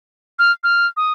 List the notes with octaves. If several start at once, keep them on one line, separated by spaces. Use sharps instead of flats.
F6
F6
D#6